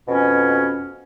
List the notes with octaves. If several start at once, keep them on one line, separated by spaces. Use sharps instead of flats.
F2 B2 C#4